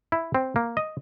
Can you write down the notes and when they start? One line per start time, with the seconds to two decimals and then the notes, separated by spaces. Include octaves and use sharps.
0.12 E4
0.35 C4
0.56 A#3
0.77 D#5